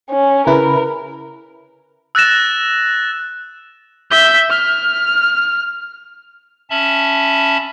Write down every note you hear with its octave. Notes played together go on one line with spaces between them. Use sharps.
C#4
C#3 E4 A#4 B4
E6 F#6 A6 A#6 E7
E5 G6
F6
C#4 E5 A5 B5